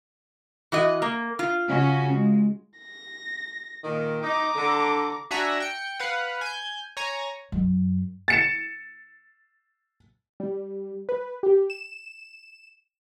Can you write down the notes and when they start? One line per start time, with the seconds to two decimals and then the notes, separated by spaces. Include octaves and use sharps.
0.72 E3 F#4 D#5
1.02 A#3
1.39 F4
1.69 C#3 C#4 F#4
2.14 G#3
2.79 A#6
3.84 A#2 D#3
4.23 D#4 A#5 D6
4.56 D3
5.31 D4 F#4 E5 F#5 G#5 A#5
5.60 G5 C#7
5.99 B4 F5 F#5
6.41 G#5 G6
6.97 C#5 G#5 A#5
7.52 F#2
8.28 A6 C#7 E7
10.40 G3
11.09 B4
11.43 G4
11.70 E7